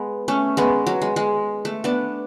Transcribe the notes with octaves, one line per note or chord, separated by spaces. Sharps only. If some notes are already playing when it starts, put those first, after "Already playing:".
Already playing: G#3 B3
A3 C#4
G#3 B3
F#3
G#3
G#3
A3
B3 D4